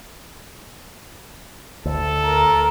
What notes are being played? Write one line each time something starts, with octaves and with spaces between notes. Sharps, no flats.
D2 A4
A#4